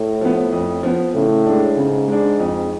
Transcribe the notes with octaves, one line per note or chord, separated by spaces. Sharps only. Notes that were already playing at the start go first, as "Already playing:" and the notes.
Already playing: A2
F3 B3
F2
F3 B3
A2 C#3
G#3 D4
G#2 C#3
G#3 D4
F2